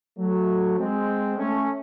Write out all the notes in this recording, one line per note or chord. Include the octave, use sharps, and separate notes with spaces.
F#3 A3
G#3 C4
A3 C#4